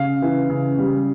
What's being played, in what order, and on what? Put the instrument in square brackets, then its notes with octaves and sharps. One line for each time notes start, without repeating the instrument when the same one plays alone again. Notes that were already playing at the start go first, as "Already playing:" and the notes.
Already playing: [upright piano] C#3 F5
E3
C#3
G3